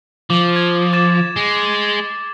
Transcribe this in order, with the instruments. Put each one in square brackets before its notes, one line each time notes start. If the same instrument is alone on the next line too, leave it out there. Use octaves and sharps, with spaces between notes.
[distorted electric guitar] F3 [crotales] D6
[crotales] G#6
D6 A6 E7
[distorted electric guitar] G#3